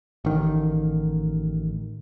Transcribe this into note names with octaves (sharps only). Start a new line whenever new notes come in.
A1 D#3